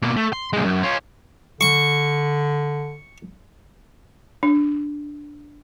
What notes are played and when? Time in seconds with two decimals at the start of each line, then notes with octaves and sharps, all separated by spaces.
0.02 B2 A#3
0.17 A3
0.33 C6
0.53 B1 G#3
0.64 F#2
0.83 C#4 F4
1.61 D3 C#6
4.43 D4